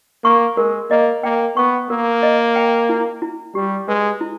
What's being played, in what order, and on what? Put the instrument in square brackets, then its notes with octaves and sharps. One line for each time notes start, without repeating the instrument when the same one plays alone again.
[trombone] A#3 [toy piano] C#6
[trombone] G#3 [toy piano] A#4
[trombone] A#3 [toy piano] D#5
[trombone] A#3 [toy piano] G5
[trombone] B3 [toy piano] C#6
[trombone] A#3 [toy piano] A#4
[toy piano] D#5
G5
E4
E4
[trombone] G3 [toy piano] G4
[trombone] G#3 [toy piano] B4
[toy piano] E4